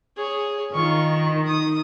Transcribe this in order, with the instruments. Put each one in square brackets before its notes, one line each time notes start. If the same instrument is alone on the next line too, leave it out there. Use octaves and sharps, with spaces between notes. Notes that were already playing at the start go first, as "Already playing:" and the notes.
[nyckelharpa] G#4 C#5
[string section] D#3 [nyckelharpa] F4 C#6
[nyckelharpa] D#6